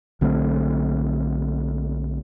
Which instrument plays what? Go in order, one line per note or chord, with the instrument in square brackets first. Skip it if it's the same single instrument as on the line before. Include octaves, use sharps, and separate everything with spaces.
[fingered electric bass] B1 D3 A3 C4